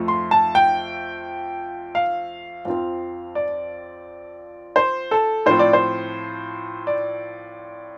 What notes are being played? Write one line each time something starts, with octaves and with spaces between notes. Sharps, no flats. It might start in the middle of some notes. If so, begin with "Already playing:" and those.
Already playing: F2 F3 A3
C6
A5
G5
F5
F2 F3 C4
D5
C5
A4
A2 F3 C4 C5
D5
C5
D5